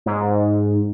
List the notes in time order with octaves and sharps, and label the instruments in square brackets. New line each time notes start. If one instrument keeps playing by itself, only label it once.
[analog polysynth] G#2